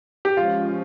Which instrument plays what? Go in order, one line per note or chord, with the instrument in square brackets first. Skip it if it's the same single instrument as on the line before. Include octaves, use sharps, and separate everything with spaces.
[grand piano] G4
[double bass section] F3 G#3 C#4 [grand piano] F4